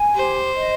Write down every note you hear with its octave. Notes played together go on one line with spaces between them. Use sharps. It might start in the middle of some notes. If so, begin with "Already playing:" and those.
Already playing: G#5
G4 C5
D#5